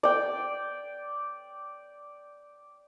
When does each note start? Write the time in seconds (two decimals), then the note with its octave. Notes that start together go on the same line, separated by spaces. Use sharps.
0.03 D5 G5